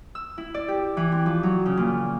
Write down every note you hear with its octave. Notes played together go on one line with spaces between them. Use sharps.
E6
E4
D5
G4
E3
C4
F3
F#3
C#3
A#2